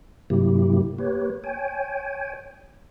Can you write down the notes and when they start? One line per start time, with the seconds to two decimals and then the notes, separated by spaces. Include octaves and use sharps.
0.30 G2 C3 F#3 A#3 E4 G4
0.98 A#3 G4 B4 C#5
1.44 C#5 G5 G#5